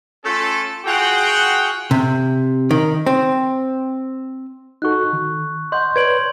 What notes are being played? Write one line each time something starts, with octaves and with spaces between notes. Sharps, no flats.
A3 C#4 F4 A4
F4 F#4 G#4 F#5 G5
C3
D#3
C4
D#4 F#4 A4 C#6 F#6
D#3
D#5 F#5 C6 G6
B4 C#5 D5 G#6 D7 F#7